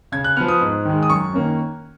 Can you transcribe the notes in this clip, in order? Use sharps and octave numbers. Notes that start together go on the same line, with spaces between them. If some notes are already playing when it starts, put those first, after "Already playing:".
C#3 G#6
F#6
F3 B3 F6
D#6
G#2
D#3 G#3
D#6
F#2 C#6
D#3 A#3 C#4